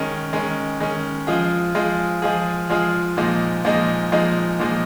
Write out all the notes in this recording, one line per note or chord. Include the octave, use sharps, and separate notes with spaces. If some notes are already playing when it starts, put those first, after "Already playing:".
Already playing: D#3 G#3 C#4
D#3 G#3 C#4
D#3 G#3 C#4
F3 G#3 F4 G#4
F3 G#3 F4 G#4
F3 G#3 F4 G#4
F3 G#3 F4 G#4
A#2 F3 G#3 D#4
A#2 F3 G#3 D#4
A#2 F3 G#3 D#4
A#2 F3 G#3 D#4